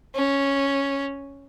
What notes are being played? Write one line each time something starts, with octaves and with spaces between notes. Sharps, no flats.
C#4